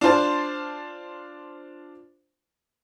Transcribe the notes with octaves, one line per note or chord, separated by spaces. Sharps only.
D4 F4 C5 A5